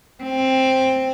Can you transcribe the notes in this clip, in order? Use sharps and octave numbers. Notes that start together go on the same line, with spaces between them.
C4